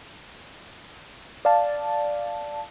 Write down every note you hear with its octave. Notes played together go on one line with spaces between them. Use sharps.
D5 F5 A5